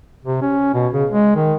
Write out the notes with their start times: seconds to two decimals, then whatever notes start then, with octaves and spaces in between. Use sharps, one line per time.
0.25 C3
0.42 C#4
0.74 B2
0.93 C#3
1.10 G#3
1.35 D#3